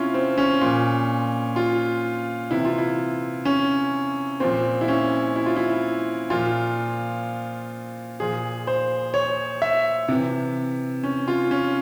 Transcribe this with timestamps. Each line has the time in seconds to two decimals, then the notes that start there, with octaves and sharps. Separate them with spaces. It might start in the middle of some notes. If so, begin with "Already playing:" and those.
Already playing: C3 C#4 E4 F4
0.14 C4
0.38 C#4
0.61 A#2 F3
1.56 F4
2.51 C3 E3 E4
2.65 F4
2.78 E4
3.45 C#4
4.40 A#2 F3 C4
4.81 E4
4.88 C#4
5.36 E4
5.46 F4
5.57 E4
6.30 A#2 F3 F4
8.20 A#2 F3 G#4
8.67 C5
9.14 C#5
9.62 E5
10.08 C3 E3
11.03 C#4
11.28 F4
11.51 C#4